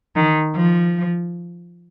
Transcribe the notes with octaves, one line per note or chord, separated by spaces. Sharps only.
D#3
F3